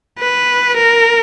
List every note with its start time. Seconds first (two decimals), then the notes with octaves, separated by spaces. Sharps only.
0.19 B4
0.77 A#4